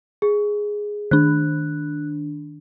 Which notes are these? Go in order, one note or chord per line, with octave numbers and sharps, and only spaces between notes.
G#4
D#3 D4 F#6